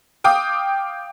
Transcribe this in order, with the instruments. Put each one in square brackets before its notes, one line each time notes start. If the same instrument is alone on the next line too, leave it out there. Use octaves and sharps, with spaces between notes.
[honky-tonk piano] F5 G5 D6 D#6